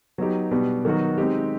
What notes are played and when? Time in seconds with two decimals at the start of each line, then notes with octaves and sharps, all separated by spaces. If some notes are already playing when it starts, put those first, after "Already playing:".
0.18 F#3 B3 D#4 G4
0.51 B2 G3 B3 D4 G4
0.85 D#3 F#3 B3 D#4 F#4
1.18 G#3 C4 D#4 G4